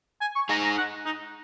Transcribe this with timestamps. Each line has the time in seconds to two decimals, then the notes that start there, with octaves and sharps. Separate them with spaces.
0.21 G#5
0.36 C#6
0.49 D#4 G#4 A#5
0.64 A#5
0.78 F#5
1.06 D#4